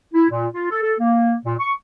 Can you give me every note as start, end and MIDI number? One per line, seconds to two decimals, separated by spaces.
0.14 0.26 64
0.30 0.47 46
0.55 0.69 65
0.71 0.82 69
0.83 0.94 69
0.99 1.34 58
1.45 1.54 46
1.60 1.73 85